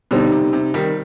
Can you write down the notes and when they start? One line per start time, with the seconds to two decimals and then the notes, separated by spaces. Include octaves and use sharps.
0.11 B2 D3 G3 C4 D#4
0.32 C3
0.53 C3
0.74 D#3 G3